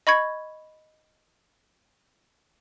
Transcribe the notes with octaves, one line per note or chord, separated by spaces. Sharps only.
D#5 B5 C#6 G#6